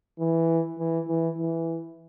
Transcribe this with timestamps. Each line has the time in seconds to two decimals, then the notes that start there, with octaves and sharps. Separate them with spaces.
0.19 E3
0.79 E3
1.08 E3
1.38 E3